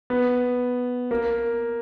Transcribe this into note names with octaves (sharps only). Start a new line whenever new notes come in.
B3
A#3